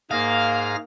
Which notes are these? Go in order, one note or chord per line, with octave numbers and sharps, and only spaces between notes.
G#2 A#3 G#4 F5 A#6